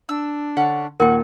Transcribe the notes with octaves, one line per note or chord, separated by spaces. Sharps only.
D4 E6
D3 C#4 F#5 A5
D#2 A#2 A#3 F#4 A#4 G5